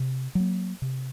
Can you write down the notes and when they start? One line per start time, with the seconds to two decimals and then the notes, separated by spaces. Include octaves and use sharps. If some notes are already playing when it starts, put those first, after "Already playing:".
Already playing: C3
0.35 F#3 A#3
0.82 C3